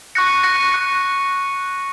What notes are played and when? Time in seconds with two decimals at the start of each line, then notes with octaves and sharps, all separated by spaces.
0.15 C#6 F#6 A#6 C#7
0.43 C#6 F#6 A#6 C#7
0.72 C#6 F#6 A#6 C#7